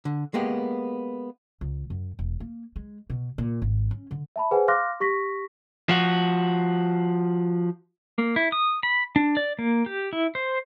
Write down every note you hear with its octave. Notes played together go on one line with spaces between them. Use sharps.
D3
G#3 A#3 B3 G4
C#2
F#2
E1
A#3
G#3
B2
A#2
G#1
C#4
D3
E5 A5 B5
G#4 B4 C5 F#5 G#5
F5 C6 D6 F6 F#6 A#6
G4 C#6 A#6 B6
F3 F#4
A#3
E4
D#6
B5
D4
D5
A#3
G4
E4
C5